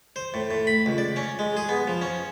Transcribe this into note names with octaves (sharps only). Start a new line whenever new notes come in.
C5
A2
A2
B5
C#2
D5
C#4
G#3
G#4
B3
F3
C#4